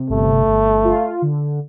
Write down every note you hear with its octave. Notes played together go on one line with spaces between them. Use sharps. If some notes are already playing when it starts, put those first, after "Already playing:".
Already playing: C3
G1 A3
G1
F4
D3